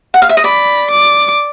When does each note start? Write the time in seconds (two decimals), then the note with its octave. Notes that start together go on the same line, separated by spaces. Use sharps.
0.14 F#5
0.22 F5
0.29 E5
0.37 D#5
0.44 D5 B5
0.91 D6